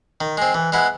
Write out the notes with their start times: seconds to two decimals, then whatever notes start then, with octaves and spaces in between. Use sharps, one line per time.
0.20 D#3
0.37 G#3 C4
0.54 E3
0.72 G#3 B3 E4